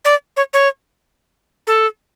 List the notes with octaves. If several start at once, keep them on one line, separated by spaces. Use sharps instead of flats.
D5
C#5
C#5
A4